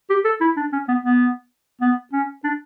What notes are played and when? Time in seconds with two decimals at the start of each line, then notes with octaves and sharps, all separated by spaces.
0.10 G4
0.25 A4
0.41 E4
0.57 D4
0.72 C#4
0.88 B3
1.03 B3
1.81 B3
2.13 C#4
2.44 D4